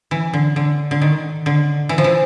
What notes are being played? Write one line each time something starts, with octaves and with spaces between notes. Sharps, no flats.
E3
D3
D3
D3
D#3
D3
E3
F3
E3